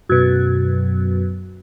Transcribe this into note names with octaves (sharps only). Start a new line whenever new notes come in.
F#2 B2